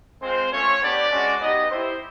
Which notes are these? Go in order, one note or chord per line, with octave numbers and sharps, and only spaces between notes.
G#3 C4 F4 C5
A3 C#4 F4 C#5
B3 D4 G4 D5
G#3 C#4 F#4
B3 D#4 G4 D#5
C4 E4 G4 C5